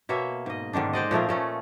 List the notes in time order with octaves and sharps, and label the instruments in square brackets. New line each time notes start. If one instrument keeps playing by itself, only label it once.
[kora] B2 A#3 C#5 E5
G#2 D#5
G#2 D3 D#3 D4
G#3 C5 D5 D#5
A#2 F3 A3 A#4
A#2 A3 C#4